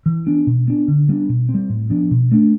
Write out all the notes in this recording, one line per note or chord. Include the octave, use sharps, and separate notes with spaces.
E3
B3 D4
B2
B3 D4
D3
G3 B3 D4
B2
C4
G3
A2
F3 B3 D4
B2
A3 D4